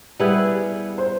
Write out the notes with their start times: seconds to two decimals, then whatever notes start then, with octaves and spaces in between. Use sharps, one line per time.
0.19 G3 B3 E4 G#4 B4
0.98 C5